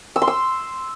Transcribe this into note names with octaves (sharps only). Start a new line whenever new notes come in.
E6
C6
E6